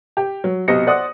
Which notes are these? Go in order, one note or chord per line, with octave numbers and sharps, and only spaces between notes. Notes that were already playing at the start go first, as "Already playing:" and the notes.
G4
F#3
B1 C3 D#5 A#6 C#7
C5 D5 F#5 D#6